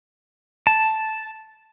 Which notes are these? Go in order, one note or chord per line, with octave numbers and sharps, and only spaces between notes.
A5